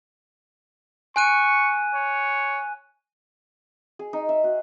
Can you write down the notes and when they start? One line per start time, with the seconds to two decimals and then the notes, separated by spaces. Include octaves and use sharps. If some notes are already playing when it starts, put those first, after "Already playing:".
1.16 G#5 C#6 F#6 D#7
1.94 C#5
3.99 G#4
4.13 D#4
4.29 E5
4.44 F#4